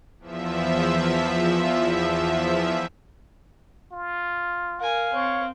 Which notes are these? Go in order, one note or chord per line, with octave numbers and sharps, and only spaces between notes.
E2 F3 E5
F4
A#4 F5 G#5
C4 C#5